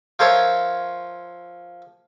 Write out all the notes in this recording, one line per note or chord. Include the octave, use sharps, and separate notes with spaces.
F3 F4 A#4 C5 C#5 E5